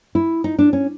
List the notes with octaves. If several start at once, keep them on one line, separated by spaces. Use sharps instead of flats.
E4
D#4
D4
C#4